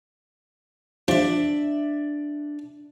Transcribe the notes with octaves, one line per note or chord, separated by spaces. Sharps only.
F3 D4 G4 E5